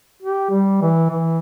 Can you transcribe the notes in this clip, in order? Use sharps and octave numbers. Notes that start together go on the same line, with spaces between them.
G4
G3
E3
E3